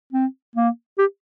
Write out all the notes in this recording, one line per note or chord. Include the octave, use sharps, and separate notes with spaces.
C4
A#3
G4